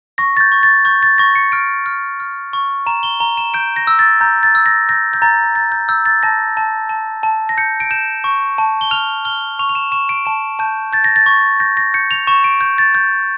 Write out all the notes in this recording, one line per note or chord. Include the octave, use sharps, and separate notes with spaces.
C#6 A#6
A6
G6
C#6
A6
C#6 G6
A6
C#6 A#6
C#7
F6 D7
F6
F6
C#6
A#5 E7
G7
A#5 G7
E7
G6 D7
A#6
E6
A6
A#5 G6
A6
E6
A#6
G6 A#6
G6
A#5 A6
G6 A6
G6
E6 G6
A6
A5 A#6
A5
A5
A5
A#6
G6 C#7
D7
G6 E7
C#6
A5
G7
F6 F7
F6 G7
C#6 F7
F7
E7
C#6 E7
D7
A5 E7
A5 G6
G6 A6
A#6
A6
C#6
G6 A#6
A#6
G6 C#7
F7
C#6 E7
D7
G6
A6
G6